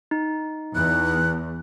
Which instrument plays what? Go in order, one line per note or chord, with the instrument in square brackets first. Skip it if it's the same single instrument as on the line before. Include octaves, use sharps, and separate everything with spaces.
[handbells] D#4
[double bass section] E2 [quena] F#6